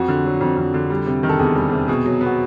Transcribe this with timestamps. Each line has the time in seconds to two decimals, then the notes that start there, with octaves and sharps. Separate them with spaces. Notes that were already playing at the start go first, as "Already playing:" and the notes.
Already playing: F2 F#4
0.08 D3
0.25 F#3
0.41 F2
0.57 F2
0.74 D3
0.90 G3
1.06 C3
1.23 D#3
1.29 A4
1.39 E2 G#4
1.56 G3
1.72 C3
1.88 B2 G#4
2.06 F#3
2.21 B3
2.26 F#4